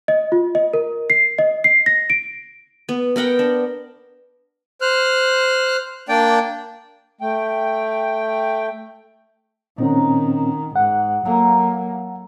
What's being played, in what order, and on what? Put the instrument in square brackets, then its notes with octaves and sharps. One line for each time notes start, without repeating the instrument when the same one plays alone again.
[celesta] D#5
F4
D#5
A#4
C7
D#5
C7
A#6
D7
[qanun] B3
B3 A#4 F#5 G5
D4
[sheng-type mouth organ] C5 F6 F#6
A#3 D4 D5 G5
[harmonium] A3 G5
[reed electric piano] A#2 C4 C#4 [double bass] D#3 [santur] D#4 F#5
[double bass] G#2 [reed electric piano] F#5
[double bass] F#3 A#3 [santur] A4 A#5